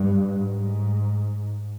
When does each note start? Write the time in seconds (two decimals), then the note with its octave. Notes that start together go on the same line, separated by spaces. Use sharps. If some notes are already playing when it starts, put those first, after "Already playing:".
Already playing: G2
0.29 G#2